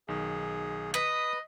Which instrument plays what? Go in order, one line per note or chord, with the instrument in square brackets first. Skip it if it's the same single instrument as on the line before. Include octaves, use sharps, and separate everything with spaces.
[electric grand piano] B1 D#3 [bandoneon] G#4
[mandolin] B4 [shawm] D#5 [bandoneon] D#6